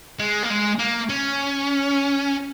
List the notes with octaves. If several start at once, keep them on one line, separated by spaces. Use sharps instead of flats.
G#3
A#3
G#3
A#3
C#4